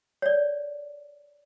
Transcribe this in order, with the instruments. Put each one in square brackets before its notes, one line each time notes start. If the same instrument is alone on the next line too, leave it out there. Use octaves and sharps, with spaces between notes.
[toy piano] C#5 D5